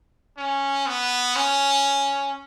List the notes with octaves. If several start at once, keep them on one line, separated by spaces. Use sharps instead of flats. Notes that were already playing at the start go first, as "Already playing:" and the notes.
C#4
B3
C#4